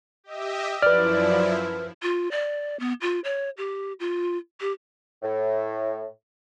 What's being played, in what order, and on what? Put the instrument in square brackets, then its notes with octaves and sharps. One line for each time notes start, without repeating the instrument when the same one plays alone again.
[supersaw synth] G4 D#5 E5
[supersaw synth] F#2 F3 E4 [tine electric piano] B4 F6 [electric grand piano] D5
[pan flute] F4
D5
B3
F4
C#5
G4
F4
G4
[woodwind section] A2